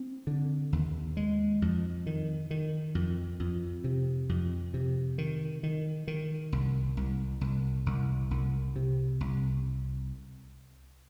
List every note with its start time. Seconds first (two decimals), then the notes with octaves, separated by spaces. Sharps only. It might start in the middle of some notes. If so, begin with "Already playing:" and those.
Already playing: C4
0.27 D3
0.73 D#2
1.17 G#3
1.62 F2
2.06 D#3
2.51 D#3
2.95 F2
3.40 F2
3.84 C3
4.29 F2
4.74 C3
5.18 D#3
5.63 D#3
6.08 D#3
6.52 C2
6.97 C2
7.41 C2
7.86 C2
8.31 C2
8.76 C3
9.21 C2